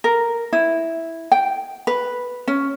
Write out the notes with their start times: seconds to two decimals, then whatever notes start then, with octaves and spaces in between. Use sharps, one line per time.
0.04 A#4
0.53 E4
1.32 G5
1.87 B4
2.48 C#4